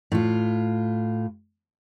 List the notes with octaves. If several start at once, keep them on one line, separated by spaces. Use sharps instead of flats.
A2 F4